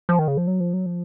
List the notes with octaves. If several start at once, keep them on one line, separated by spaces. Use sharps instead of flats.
F3
D#3
C#3
F3
F#3
F3
F#3
F3